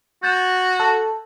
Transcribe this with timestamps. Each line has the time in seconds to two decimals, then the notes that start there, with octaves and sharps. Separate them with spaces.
0.23 F#4 G6 A6 E7
0.80 A4